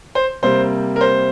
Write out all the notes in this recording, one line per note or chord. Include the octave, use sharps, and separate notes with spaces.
C5
C3 G3 A#3 C5
A#4
C5